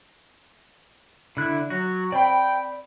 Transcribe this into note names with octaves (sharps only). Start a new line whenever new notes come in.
D3 E4 F#6
F#3 F#4
C4 D5 G5 B5